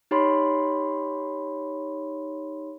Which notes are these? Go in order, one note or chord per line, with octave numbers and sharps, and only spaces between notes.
D#4 G4 C#5 B5 C6